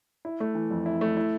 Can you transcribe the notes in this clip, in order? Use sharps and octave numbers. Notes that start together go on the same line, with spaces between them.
E4
A3
E3
F2
E4
A3
E4